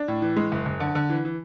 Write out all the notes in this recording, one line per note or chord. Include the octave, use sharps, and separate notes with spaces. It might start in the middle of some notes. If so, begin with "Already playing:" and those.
Already playing: D4
A2
E3
G#3
F#1
F#1
D3
D3
E3
E3